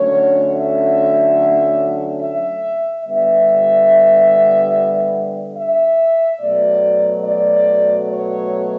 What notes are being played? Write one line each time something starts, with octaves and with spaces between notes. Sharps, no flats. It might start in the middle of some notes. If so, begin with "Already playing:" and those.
Already playing: D3 F#3 A3 C#4 C#5
E5
E5
D3 G3 B3 E5
E5
B2 F#3 A3 D5
D5
C#5